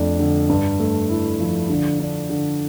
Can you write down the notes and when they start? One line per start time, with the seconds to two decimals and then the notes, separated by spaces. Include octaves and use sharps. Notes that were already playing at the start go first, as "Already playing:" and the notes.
Already playing: F2 A3 D4
0.19 D3
0.49 G2
0.80 A3
1.10 E4
1.40 F3
1.70 D3
2.00 D4
2.30 D3